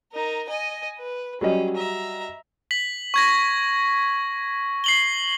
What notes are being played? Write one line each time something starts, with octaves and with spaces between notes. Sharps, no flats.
D#4 A#4
D#5 G#5
B4
F#3 G3 C#4 D#5
E5 A#5
B6 F#7
C#6 G#6 A#6
C7 F#7 G7